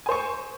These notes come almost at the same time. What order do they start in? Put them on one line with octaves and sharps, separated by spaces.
G#5 C5 C#6